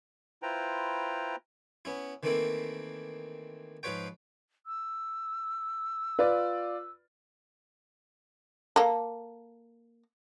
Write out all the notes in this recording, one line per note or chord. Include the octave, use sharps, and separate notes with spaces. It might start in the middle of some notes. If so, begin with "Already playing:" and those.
E4 F4 B4 C5 G5 A#5
B3 C#4 E4
D#3 E3 A3 A#3 C4 E4
G#2 F3 F4 B4 C#5 G5
E6
F4 B4 D5
A#3 A4